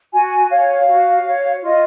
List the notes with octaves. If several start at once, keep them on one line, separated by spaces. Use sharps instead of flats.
F#4 G#5
C#5 F5
F#4
C#5
F4 D#5